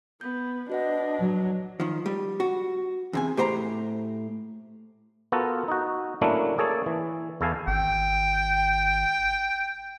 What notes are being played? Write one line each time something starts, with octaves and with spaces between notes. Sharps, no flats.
B3 G6
D4 F#4 B4 D#5 F#5
F#3
D#3 F3
G3
F#4
E2 C3 G#5
A2 G4 C5 A#5
B3 F4 F#4 A4 A#4
D#4 F#4
F#3 A3 A#3 C#4 D4 E4
A#3 G#4 A4 C#5 D5
E3
E2 E4 A4 F5 G#5
G#1 G5